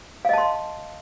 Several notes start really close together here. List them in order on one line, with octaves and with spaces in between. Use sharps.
F5 D#5 A5 C6